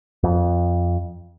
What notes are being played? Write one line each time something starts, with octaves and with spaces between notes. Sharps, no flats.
F2